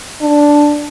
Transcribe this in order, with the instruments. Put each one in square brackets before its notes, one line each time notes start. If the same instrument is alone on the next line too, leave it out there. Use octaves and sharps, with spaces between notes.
[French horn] D4